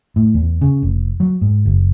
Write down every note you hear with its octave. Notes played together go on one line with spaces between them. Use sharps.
A2
E2
C#3
F1
F#3
G#2
F#1